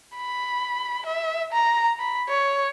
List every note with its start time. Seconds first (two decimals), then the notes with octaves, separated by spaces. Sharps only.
0.16 B5
1.06 E5
1.53 A#5
1.99 B5
2.29 C#5